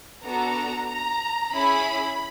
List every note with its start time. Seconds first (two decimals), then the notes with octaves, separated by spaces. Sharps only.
0.24 B3 D4 F#4 A4 A#5
0.89 A#5
1.53 C#4 E4 G#4 B5